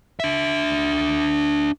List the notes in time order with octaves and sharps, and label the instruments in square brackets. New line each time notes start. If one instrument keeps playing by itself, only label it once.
[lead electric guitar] D4 E5